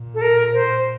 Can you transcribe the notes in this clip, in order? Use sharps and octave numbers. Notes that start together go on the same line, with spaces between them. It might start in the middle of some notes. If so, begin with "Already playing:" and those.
Already playing: A#2
A4
A#4
C5